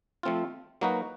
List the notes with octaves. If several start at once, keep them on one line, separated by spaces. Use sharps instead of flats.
F3 A3 C4 F4
F#3 A#3 D#4 F#4 B4